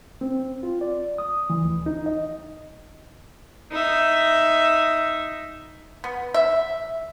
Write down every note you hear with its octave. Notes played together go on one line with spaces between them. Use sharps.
C4
F4
D5
D#6
E3
D2
D#4
D#5
D#4 E5
B3
E5